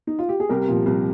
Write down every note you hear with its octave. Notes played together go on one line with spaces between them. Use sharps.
D#4
F4
G4
G#4
C2 G4 A#4
A#2 F3
C2